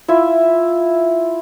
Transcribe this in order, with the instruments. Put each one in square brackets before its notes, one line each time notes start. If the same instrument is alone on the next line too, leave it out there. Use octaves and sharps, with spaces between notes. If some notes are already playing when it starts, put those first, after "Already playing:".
[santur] E4 F4 E5